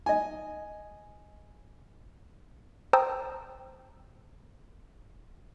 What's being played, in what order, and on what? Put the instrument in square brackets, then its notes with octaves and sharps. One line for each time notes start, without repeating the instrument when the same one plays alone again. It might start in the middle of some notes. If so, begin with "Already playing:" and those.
[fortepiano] D#5 G#5
[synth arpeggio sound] C5 G5 A5 A#5 D#6 E6